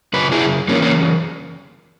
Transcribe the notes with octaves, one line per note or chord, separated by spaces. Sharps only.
F#2 C#3 B4
E4 G#4
F#2 C#3 E3 A#3 C#4
A#3 C#4